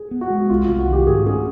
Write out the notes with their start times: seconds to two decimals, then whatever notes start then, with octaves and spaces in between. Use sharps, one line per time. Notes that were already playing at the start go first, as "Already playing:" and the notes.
Already playing: G#4
0.11 B3
0.21 F#4
0.30 G#3
0.50 C2 F4
0.64 C2 F4
0.79 F#4
0.88 D#3 G4
1.07 G#2 G#4
1.26 C#4 G#4